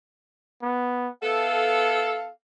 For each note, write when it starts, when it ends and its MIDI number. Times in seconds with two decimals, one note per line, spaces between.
0.63 1.09 59
1.23 2.29 59
1.23 2.29 64
1.23 2.29 69
1.23 2.31 77